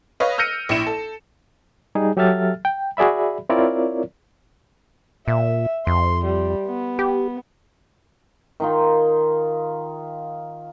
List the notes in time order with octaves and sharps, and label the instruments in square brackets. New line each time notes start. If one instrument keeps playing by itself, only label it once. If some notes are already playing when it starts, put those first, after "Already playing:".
[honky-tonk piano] B4 C#5 D#5 F5
E6 F6 G6 A#6 C#7 D#7
A#1 E4 C#7 E7
A4
[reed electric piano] G3 D#4 G#4
F#3 G4 A4 E5 F6 A6
G5
F#4 G#4 D5 E5 B5
C4 E4 F4 A#4 C#5 D5
[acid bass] A#2 [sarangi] E5
[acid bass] F2 [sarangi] C6
[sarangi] G3
B3
[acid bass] G4
[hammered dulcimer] D#3 D#4 F4